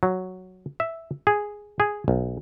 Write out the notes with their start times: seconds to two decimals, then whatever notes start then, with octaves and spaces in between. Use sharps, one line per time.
0.03 F#3
0.80 E5
1.27 G#4
1.80 G#4
2.08 B1